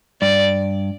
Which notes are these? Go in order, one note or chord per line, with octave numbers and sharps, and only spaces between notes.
G2 D5